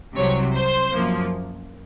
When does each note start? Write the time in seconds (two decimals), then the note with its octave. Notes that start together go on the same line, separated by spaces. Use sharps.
0.16 C2 C3 F#3 C#5
0.54 C5
0.92 F#2 F3 A#3